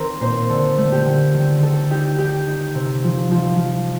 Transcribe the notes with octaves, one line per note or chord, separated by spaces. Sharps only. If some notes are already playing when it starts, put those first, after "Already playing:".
Already playing: D#3 C4 A#4
A#2 C5
D3 A4
A3
G4
D3
D#3 A4
D#3 A4
D#4 G4
D#4 G4
D#4
C3
F3
F3
F3